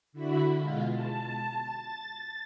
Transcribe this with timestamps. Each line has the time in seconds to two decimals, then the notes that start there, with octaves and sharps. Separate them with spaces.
0.13 D3 E4 F#4 B5
0.57 B2 G#3 F4
0.92 A5
1.58 A6